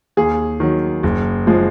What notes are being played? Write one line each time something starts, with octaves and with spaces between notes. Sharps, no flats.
D#2 G#4
D#3 F#3
F#1
F3 G#3